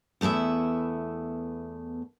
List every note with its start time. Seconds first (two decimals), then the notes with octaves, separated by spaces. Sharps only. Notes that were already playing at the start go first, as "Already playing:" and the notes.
0.21 E2 A3 B3 E4 E5